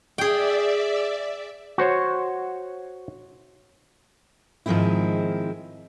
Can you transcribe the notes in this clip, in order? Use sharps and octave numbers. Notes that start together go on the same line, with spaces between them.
G#4 D5 E5 G5
F#4 C5 C#5
G#2 D#3 F3 G#3 C4 E4